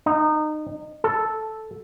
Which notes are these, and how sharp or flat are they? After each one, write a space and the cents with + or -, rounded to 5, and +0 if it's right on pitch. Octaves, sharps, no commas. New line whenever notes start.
D#4 -25
A4 -5